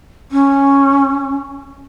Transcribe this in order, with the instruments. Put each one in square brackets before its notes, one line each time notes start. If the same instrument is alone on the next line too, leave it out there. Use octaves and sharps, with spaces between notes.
[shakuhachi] C#4